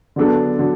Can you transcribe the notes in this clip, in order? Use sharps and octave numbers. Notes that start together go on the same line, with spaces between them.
D3 F#3 B3 D4 A4
D3 F#3